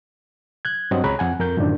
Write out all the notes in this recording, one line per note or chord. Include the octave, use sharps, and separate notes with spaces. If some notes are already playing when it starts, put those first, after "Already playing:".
F#6 G#6
G2 F#3 C4 D#5 F#5
C#2 G#4 C#5 A#5 B5 F#6
F2 F#5 G#5
F2 A#4 G6
F#2 A2 D3 D#3 F3 D4